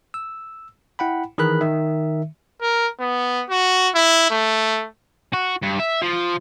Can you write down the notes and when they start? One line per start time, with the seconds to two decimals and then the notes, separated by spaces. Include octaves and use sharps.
0.14 E6
0.99 E4 F#5 G5 B5
1.38 D#3 E3 G#4 A#4 B5 F#6
1.61 D#3 E5
2.61 A#4
3.00 B3
3.50 F#4
3.95 E4
4.31 A3
5.33 F#4
5.63 G2
5.80 E5
6.02 F3